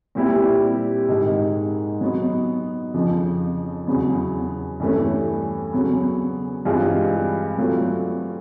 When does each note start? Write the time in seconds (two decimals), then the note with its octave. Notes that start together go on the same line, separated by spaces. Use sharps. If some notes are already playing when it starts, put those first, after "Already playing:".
0.15 A#2 G3 C4 E4 G4
1.09 G#2 D#3 G#3
2.01 F#3 B3 D#4
2.94 F2 C#3 F3
3.87 E2 C#3 F#3 B3
4.80 G2 E3 A3 C#4
5.73 C#3 F#3 B3
6.65 G2 E3 G#3 C4 F4
7.58 F#3 A3 C4 F4